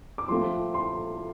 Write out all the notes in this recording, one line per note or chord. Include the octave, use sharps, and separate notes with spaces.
D6
F3 A3 C4 F4 C6
C6